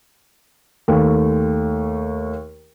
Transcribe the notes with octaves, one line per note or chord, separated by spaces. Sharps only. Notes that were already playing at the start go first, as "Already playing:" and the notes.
D#2 A3